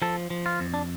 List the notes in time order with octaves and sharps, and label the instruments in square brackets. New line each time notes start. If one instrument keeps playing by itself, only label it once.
[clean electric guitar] F3 A4
F3
F4
F2
D4